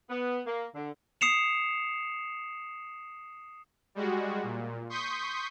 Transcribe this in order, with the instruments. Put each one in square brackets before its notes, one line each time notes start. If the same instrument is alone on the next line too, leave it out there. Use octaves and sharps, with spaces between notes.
[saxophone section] B3
A#3
D3
[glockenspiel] D#6 C7 C#7 E7 F7
[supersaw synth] G3 G#3 F#4
A#2
C6 C#6 D#6 G6 B6